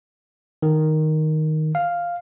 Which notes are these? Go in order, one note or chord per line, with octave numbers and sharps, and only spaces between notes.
D#3
F5